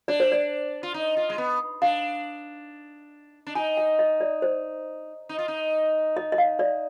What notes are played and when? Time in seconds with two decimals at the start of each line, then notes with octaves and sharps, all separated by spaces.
0.08 D4 D5
0.20 C5
0.32 D5
0.83 F4
0.94 D#4
1.17 F4
1.30 G#3
1.38 B3
1.82 D4 F5
3.47 D4
3.55 D#4 G#5
3.77 G5
3.99 D#5
4.21 D5
4.42 C5
5.29 D#4
5.38 F4
5.48 D#4
6.17 D#5
6.32 D#5
6.38 F5
6.59 D5